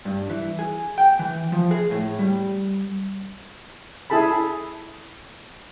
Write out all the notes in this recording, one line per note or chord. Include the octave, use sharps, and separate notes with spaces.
G2
E3
G#4
G5
E3
F3
G#4
A2
G3
E4 G#4 A4 A5 B5